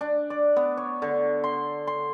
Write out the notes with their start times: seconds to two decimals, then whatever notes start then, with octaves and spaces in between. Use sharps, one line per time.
0.01 D4
0.30 D5
0.56 B3
0.77 C#5
1.02 D3
1.44 C6
1.87 C6